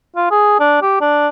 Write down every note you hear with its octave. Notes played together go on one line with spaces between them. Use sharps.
F4
G#4
D4
G4
D4